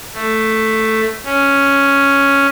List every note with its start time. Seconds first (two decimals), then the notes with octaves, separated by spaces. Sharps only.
0.14 A3
1.25 C#4